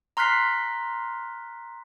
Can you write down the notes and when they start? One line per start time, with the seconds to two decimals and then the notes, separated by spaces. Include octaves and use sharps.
0.17 A#5 C6 F6 F#6 B6 C7